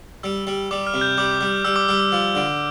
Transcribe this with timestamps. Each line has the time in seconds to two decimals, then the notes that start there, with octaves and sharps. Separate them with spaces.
0.23 G3 E6
0.47 G3
0.71 G3 D6
0.87 F6
0.94 C3
1.01 G6
1.18 G3 D6
1.41 G3
1.65 G3 E6
1.76 D6
1.88 G3 E6
2.00 D6
2.12 F3
2.35 D3